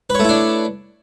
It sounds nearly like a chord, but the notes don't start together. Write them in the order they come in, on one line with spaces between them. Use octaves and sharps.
B4 C#5 A3 E4 D4